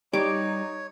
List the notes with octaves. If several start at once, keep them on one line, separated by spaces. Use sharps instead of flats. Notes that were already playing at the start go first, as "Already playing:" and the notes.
G3 D#4 C#5 D6